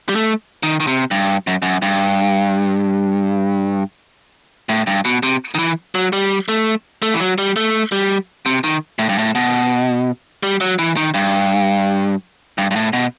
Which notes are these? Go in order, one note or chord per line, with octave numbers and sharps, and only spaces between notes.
G3
A3
D#3
D#3
C3
G2
F#2
F#2
G2
A2
G2
B2
C3
D#3
E3
F#3
G3
A3
A3
E3
F#3
G3
A3
G3
C3
D#3
A2
G2
A2
B2
G3
F#3
E3
D#3
G2
G2
G2
A2
B2